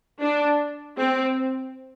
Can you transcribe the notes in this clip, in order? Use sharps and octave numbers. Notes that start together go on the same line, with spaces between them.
D4
C4